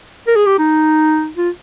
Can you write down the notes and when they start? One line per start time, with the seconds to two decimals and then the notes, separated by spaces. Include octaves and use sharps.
0.27 A#4
0.36 G#4
0.46 G4
0.58 D#4
1.37 F4